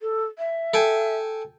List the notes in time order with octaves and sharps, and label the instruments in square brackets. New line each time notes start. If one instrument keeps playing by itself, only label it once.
[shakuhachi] A4
E5
[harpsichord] A4 G5 G#5